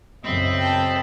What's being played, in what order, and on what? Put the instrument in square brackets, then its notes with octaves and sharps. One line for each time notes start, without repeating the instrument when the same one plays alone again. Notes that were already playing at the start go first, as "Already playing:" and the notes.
[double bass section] B1 F#2 C#3 [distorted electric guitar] C4 [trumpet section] D#5 E5 B5
[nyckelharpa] G5 A5